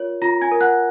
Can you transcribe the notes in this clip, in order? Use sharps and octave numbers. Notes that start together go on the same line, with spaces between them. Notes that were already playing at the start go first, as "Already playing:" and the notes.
Already playing: F4 A#4 C#5
F4 A#5 A#6
G#5 G#6
A#4
F#5 F#6